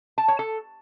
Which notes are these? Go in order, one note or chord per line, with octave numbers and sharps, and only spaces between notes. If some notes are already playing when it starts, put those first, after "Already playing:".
A5
C#5
A4